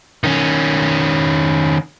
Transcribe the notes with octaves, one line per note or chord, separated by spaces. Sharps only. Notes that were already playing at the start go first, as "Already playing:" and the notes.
D#3 C#4